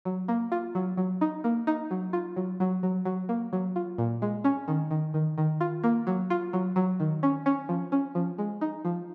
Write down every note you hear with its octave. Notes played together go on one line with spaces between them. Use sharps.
F#3
A#3
F4
F#3
F#3
D#4
A#3
D#4
F#3
F4
F#3
F#3
F#3
F#3
A#3
F#3
F4
A#2
G#3
C#4
D#3
D#3
D#3
D#3
F4
A#3
F#3
F4
F#3
F#3
D#3
C#4
C#4
F3
C#4
F3
G#3
D#4
F3